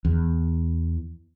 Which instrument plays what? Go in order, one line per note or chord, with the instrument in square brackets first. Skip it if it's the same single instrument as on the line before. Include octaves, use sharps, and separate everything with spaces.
[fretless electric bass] E2